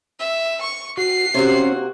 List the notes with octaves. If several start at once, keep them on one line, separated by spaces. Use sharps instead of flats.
E5
C#6
F#4 C7
C3 A#3 C4 C#4 F#4